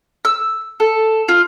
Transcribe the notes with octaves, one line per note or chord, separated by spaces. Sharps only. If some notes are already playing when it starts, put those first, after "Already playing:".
E6
A4
F4